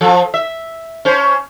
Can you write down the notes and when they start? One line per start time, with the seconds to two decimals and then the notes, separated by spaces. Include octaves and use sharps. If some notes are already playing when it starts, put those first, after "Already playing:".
0.01 F3 A4
0.34 E5
1.05 C#4 C5